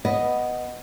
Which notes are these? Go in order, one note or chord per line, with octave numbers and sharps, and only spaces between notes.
B3 D#5